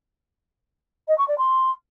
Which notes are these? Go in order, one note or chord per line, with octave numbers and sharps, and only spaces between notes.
D#5
C#6
D5
C6